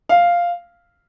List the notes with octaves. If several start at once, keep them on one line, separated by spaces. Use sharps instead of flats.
F5